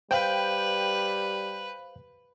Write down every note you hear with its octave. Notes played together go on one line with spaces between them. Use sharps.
G3 B4 C5 F5 G5